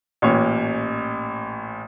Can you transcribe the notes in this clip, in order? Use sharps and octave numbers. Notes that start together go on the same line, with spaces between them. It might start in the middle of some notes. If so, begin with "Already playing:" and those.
A1 A#2 C#5